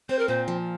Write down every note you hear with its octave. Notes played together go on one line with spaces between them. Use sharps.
C4 C5
A#4
A#2 C5
F3